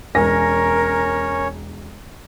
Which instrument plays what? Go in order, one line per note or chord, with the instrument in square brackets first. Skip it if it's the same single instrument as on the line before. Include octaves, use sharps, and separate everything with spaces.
[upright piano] E1 G#5 A#6 [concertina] C#4 C#5 [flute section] A#4